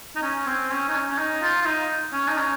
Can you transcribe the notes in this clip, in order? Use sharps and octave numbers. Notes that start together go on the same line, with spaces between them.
D#4
C#4
C4
C#4
D#4
C#4
C#4
D#4
F4
F4
D#4
C#4
D#4
C#4